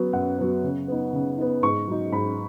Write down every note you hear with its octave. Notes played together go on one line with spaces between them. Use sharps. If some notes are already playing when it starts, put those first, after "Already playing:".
Already playing: F#3 B3
F#2 F#5
F#3 B3
C#3
B3 D#4
C#3
B3 D#4
G#2 C#6
F#3 D#4
G#2 B5